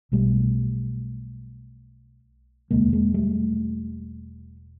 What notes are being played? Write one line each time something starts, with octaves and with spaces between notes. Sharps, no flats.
B1 B2 G3 A3
E1 D2 C3 G#3 A#3
G#3 A#3
G3 A3